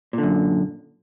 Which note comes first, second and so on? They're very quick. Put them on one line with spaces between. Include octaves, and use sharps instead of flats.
A#2 D3 F#2